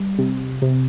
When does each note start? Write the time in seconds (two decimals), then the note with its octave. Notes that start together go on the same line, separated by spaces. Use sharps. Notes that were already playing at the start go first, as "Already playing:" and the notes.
Already playing: G3
0.19 C3
0.62 C3